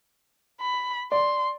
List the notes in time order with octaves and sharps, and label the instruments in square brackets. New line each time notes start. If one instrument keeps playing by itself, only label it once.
[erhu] B5
[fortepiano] D5 [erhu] C6